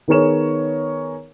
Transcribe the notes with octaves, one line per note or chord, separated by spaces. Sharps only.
D#3 B3 G#4 A#4 C#5 E7